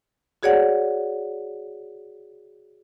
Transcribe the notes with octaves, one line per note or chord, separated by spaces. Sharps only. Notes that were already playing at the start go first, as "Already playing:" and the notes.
F#4 G#4 C#5 D5 F#5